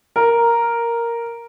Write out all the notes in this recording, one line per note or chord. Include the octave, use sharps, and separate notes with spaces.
A#4